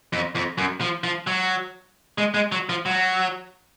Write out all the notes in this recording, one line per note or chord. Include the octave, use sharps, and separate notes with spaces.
F2
F2
F#2
F3
F3
F#3
G#3
G#3
F#3
F3
F#3